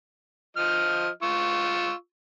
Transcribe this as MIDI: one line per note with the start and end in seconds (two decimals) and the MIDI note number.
0.57 1.09 53
0.57 1.09 75
0.57 1.09 89
1.23 1.93 65
1.23 1.93 85
1.23 1.93 88